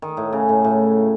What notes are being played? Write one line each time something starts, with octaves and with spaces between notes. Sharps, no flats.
D#3
A2
C#3
A2
A2